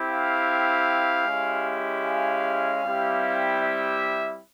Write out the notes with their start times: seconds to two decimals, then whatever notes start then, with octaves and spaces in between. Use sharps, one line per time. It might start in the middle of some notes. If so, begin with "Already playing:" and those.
Already playing: C4 E4 G4
0.09 F5
1.26 G#3 C#4 E4 G4
2.05 F5
2.84 G3 C4 E4 G4
3.62 E5